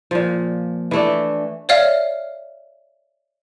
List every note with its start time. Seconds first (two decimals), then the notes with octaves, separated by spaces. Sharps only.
0.11 A#2 F3
0.91 E3 A3 D4
1.69 C#5 D5 E5 F5 F6